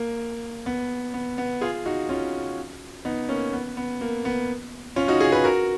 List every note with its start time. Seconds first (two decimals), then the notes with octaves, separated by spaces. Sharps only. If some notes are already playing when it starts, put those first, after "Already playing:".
Already playing: A#3
0.66 B3
1.14 B3
1.38 B3
1.61 F4 G#4
1.86 D#4 F#4
2.09 C#4 F4
3.05 B3 D#4
3.29 A#3 C#4
3.53 B3
3.77 B3
4.01 A#3
4.25 B3
4.96 C#4 F4
5.08 D#4 F#4
5.20 F4 G#4
5.32 G#4 B4
5.44 F#4 A#4